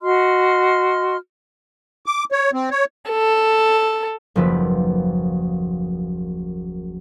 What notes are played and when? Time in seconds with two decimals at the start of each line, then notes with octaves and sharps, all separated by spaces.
0.01 F#4 D#5 C6 F6
2.06 D6
2.32 C#5
2.53 C4
2.71 C#5
3.11 A4
4.36 F#1 D#2 F3 B4 E5